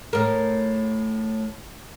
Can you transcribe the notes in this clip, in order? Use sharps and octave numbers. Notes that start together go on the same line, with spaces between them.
A2 A#4